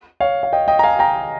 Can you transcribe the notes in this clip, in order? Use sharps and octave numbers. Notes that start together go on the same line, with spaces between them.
C#5 F5
F5
D#5 G5
D#5 G5
A#5
F5 G#5
G5 A#5